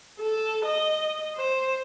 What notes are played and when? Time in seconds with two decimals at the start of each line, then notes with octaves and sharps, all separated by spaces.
0.19 A4
0.65 D#5
1.36 C5